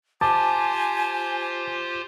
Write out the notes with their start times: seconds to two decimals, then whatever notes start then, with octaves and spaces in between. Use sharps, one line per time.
0.21 F4 G4 C5 G#5 A5 D6